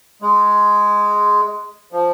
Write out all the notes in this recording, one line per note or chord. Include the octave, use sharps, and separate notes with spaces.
G#3
F3